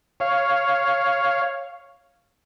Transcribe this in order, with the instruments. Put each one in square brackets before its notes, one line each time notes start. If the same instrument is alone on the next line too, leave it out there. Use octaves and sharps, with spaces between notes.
[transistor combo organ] C#5 F5